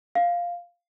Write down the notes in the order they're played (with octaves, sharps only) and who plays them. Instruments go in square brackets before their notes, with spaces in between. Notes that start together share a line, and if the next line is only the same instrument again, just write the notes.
[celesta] F5